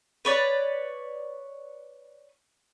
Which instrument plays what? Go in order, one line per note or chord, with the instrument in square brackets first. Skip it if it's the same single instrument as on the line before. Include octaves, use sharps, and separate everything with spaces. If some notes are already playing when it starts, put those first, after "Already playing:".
[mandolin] B4 C#5 D5